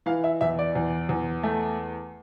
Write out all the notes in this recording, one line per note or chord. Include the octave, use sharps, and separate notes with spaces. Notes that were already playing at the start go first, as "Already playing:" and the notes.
E3 F5
E5
E2 E5
D5
E2
E2
A3